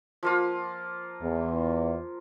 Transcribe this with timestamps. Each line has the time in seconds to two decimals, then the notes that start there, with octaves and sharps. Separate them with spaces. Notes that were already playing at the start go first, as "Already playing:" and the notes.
0.23 F3 A#3 F4
1.22 E2